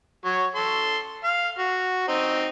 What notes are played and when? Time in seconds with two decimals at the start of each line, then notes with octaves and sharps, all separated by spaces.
0.25 F#3 C#5
0.55 A4 C6
1.24 F5
1.59 F#4
2.08 C4 D#4